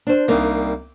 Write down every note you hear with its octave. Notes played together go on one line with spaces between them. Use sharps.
D4 C5
C2 G3 A#3 D#4